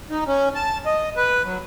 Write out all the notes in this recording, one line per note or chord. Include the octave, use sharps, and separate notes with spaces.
D#4
C#4
A5
D#5
B4
F#3